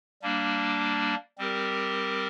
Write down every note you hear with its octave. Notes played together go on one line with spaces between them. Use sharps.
G3 A#3 D4
G3 C4 G4 A#4